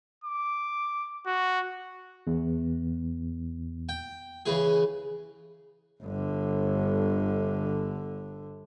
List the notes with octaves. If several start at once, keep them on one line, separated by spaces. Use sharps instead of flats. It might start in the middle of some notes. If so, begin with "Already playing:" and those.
D6
F#4
E2
G5
C#3 E3 G#4
G1 D3